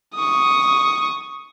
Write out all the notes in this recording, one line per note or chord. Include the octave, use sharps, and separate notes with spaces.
C#6 D#6